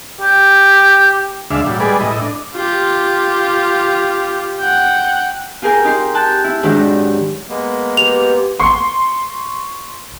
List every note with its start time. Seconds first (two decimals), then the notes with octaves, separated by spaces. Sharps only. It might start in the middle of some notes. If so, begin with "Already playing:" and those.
0.21 G4
1.50 D2 G#3 D4 E5 F5
1.66 A2 F#3 G3
1.80 G3 G#3 G#4 B4 D5
2.01 A2 E4 D#5
2.20 D4
2.54 F4 G4
4.60 F#5 G5
5.62 F4 G4 G#4 A#4 G5 G#5
5.84 D#4 G4 C6
6.15 G5 A5 F#6
6.44 E4
6.63 G#2 D#3 F#3 D4 F#4 G4
7.49 G#3 A#3 B3
7.97 G4 B4 F7
8.60 C6 C#6